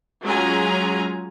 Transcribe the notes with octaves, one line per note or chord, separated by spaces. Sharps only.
F#3 G#3 C#4 F4 G#5 A#5